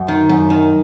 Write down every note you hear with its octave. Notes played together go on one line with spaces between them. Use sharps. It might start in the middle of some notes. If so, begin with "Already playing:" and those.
Already playing: F#2
D#3
F#2
D#3